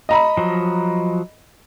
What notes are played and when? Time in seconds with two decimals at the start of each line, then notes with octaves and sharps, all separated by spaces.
0.09 D#5 A#5 B5
0.37 F3 F#3